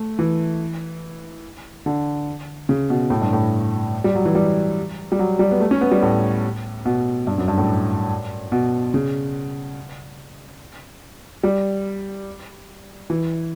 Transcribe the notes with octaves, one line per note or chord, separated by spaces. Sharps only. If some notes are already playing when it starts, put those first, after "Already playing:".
Already playing: A3
E3
D3
C#3
B2
A2
G2
A2
G3
F#3
E3
G3
G3
F#3
G3
B3
A3
C#4
B3
G3
A2
B2
G2
F#2
G2
A2
B2
C#3
G3
E3